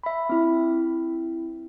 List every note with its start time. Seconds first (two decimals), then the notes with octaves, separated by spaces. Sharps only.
0.03 E5 B5
0.29 C4 E4